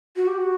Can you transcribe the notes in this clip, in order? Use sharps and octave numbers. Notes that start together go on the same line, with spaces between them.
F#4
G4
F#4